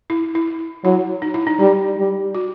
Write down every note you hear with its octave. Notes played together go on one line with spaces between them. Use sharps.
E4
E4
F#3 E4
D#4
E4
D#4
G3 D#4
G3
F#4